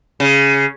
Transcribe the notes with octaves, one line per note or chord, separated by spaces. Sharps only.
C#3